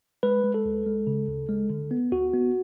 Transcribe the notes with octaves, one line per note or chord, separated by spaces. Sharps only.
G#3 B4
G#3
A4
D2
G#3
C#3
D2
G#3
D3
B3
D2 F#4
B3